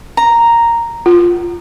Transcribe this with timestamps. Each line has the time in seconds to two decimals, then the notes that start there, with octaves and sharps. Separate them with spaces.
0.17 A#5
1.06 F4